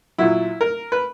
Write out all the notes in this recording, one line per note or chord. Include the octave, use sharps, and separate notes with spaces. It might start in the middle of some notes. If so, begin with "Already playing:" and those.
A#2 F#3 E4
A#4
B4